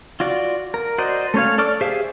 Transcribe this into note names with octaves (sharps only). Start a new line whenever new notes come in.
F4 F#4 D5
A#4
F#4 C5 D5 D#5
A3 C#4 C#5 F5
A4 D5 C#6 D6 F6
G4 G#4 C5 E5 F5